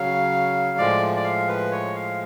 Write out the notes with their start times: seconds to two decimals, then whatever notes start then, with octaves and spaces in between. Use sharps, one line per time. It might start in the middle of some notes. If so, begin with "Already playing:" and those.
Already playing: C#3 F#3 F5
0.78 A2 F3 G#3 D5
1.16 D5
1.24 F5
1.48 B4
1.72 C#5
1.95 F5